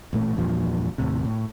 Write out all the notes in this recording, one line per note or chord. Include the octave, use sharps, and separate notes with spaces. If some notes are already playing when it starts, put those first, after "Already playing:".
A1 A#2 A3
E2 G2 A#2 F3
D#2 A2 C3
A2